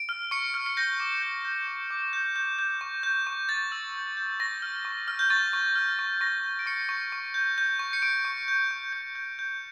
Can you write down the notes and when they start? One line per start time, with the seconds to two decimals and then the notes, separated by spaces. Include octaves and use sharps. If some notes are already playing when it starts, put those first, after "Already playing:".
Already playing: D7
0.09 F6
0.31 C#6 C#7
0.54 F6
0.66 C#7
0.77 G6 A#6
1.00 D6
1.22 G6
1.45 G6
1.67 D6
1.91 D6
2.13 G6
2.36 G6
2.59 G6
2.81 C#6
3.03 G6
3.27 C#6
3.49 G6 A6
3.72 E6
3.94 G6
4.17 G6
4.40 C#6 A#6
4.62 F6
4.85 C#6
5.08 F6
5.19 G6
5.30 C#6 A6
5.53 C#6
5.75 F6
5.99 C#6
6.21 C#6 A#6
6.44 G6
6.59 D7
6.66 C#6 C#7
6.89 C#6
7.12 C#6
7.34 G6
7.58 G6
7.79 C#6
7.93 C#7
8.02 C#6 D7
8.25 C#6
8.48 G6
8.71 C#6
8.93 G6
9.15 G6
9.39 G6